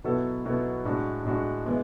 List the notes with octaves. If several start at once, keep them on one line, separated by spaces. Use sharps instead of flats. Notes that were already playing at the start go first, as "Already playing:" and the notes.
B2 F#3 B3 E4 A4
B2 F#3 B3 E4 A4
A2 G#3 D4 F#4
A2 G#3 D4 F#4
E3 G#3 B3